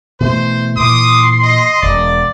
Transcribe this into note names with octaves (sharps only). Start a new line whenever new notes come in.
B2 E3 A3 C5
A#2 E3 C6 D6 D#6
D#5
E1 D5